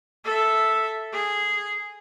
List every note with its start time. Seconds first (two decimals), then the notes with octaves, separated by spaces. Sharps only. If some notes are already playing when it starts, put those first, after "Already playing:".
0.24 A4 E5
1.13 G#4